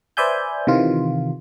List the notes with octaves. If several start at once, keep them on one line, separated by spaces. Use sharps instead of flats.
B4 C5 D5 E5 G#5 G6
C3 D#3 E3 F4